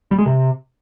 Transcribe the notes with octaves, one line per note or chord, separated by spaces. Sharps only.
G3
G#3
C3